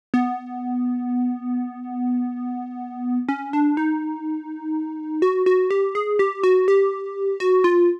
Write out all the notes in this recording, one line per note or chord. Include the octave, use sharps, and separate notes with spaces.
B3
C#4
D4
D#4
F#4
F#4
G4
G#4
G4
F#4
G4
F#4
F4